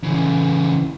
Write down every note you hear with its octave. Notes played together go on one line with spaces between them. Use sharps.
C#3 E3